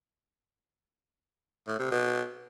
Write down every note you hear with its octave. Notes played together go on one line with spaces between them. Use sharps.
A2
C3
B2